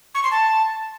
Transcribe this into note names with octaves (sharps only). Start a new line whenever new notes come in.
C#6
C6
A5